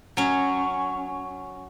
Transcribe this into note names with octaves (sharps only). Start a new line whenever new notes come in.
F#3 C#4